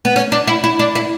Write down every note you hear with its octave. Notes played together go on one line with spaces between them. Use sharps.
B3
C#4
D4
E4
E4
D4
E4